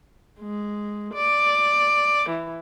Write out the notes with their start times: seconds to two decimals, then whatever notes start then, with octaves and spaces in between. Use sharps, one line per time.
0.40 G#3
1.14 D5
2.29 E3